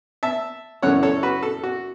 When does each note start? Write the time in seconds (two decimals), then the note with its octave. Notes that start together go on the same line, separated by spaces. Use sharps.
0.23 E5 A5
0.82 F#2 C#3 E3 A3 C#5 F#5
1.03 A4 C#5
1.23 F#4 B4
1.43 A4
1.63 F#4